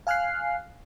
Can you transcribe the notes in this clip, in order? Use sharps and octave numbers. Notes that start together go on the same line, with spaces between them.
F5 G#5 F6 F#6 C7